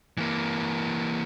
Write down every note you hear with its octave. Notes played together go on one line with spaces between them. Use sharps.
E3 A#3